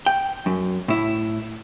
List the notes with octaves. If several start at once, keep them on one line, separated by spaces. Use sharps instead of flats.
G5
F#2
A2 E4